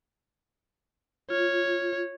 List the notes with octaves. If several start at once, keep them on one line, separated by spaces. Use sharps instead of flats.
F4 C#5